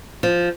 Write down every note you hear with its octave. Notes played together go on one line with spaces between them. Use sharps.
F3